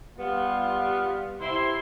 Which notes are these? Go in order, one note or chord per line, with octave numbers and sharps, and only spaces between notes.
G3 B3 F4
C3 E4 C6